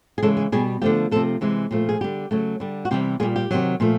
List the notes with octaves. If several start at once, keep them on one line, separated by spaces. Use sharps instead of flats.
G#4
C#3 E3 G#3 A4
G#4
B2 G3 G#4
D3 F3 A3 G4
C3 F3 A3 A4
C3 E3 G#3
A#2 F3 A3
G#4
D3 G3 G4
C#3 F#3 A3
D3 G3
F#4
C3 E3 G3 G4
A#2 G3 G#4
G4
C3 D#3 F#3
A#2 F3 A3